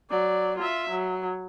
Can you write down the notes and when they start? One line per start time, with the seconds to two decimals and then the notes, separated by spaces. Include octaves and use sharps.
0.10 F#3 D5
0.58 F4 E5
0.90 F#3